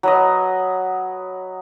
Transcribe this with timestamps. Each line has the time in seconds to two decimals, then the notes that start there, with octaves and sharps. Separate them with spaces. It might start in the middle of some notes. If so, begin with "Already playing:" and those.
0.03 F#3 B4 D#5